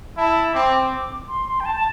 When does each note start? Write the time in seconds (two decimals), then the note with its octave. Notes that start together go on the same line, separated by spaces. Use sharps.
0.17 E4 A5
0.54 C4 D6
0.71 D6
1.28 C6
1.48 C6
1.60 G5
1.65 A5
1.76 A5